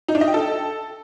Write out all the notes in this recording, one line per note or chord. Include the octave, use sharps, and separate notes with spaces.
D#4
D4
D#5
G5
A4